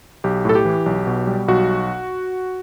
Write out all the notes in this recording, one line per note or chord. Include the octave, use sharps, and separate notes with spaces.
B1 G4
A2 A4
G4
E3
B1
B2
G3
B1 F#4